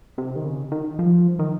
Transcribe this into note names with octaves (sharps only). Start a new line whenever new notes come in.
C3
D#3
C#3
D#3
F3
D#3